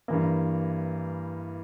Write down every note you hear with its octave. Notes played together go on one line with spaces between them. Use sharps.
G2 E3 A#3